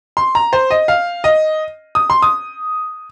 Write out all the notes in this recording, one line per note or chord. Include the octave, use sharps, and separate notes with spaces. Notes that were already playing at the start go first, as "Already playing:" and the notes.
C6
A#5
C5
D#5
F5
D#5
D#6
C6
D#6